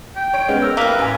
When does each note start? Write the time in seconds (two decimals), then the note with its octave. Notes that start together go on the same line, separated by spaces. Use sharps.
0.16 G5
0.34 C#5 D7
0.48 G#3 B3 C#4
0.62 A#4 E6
0.77 G3 A#3 B4
0.99 A1 G#5